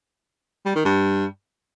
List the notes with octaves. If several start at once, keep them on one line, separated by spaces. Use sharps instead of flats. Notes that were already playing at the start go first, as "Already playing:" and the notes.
G3
D#3
G2